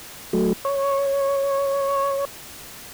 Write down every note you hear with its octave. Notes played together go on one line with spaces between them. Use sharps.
F#3 A3
C#5